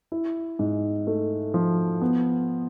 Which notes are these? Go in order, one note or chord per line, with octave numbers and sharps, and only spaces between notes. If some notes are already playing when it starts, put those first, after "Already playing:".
E4
G#2
A3
F3
B3